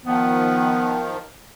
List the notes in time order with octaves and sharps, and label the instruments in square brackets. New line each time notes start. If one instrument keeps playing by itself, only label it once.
[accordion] D#3 F3 [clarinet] B3